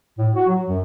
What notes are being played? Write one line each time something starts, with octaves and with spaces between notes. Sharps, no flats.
A2
F#4
F#3
F#2